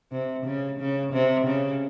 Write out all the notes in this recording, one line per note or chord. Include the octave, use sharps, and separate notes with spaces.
C3
C#3
C#3
C3
C#3